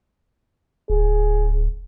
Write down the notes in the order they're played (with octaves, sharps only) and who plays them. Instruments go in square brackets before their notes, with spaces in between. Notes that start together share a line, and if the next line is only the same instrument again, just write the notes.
[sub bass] D1 [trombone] G#4